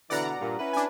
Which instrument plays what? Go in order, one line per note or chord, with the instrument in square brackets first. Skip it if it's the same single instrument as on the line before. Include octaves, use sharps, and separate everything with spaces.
[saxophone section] B2 D3 E3 [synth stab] D5 F#5 A#5
[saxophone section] G2 A#2
C#4 E4 B4
[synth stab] D4 G#5